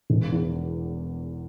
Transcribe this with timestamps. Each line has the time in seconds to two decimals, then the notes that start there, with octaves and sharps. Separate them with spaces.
0.10 E1
0.32 E2